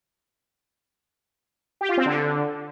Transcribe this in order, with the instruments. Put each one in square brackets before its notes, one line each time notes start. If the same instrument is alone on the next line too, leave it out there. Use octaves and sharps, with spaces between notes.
[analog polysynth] G4
F4
C4
D3